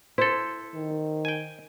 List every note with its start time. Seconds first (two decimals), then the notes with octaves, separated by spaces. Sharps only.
0.18 E4 A4 C5
0.75 D#3
1.25 G5 G#5